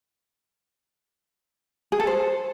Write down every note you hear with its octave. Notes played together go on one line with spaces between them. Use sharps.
G#4
A4
C5